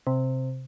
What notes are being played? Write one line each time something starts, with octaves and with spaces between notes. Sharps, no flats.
C3